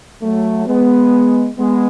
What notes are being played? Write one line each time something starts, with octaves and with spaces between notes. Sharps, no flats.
F#3 A3
G#3 B3
G#3 B3